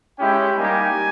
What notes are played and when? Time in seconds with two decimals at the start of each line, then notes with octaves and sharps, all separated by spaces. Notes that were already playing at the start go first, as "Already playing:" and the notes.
0.19 G#3 C#4 E4 G4 G5
0.57 G3 A#3 D#4 G4 G#5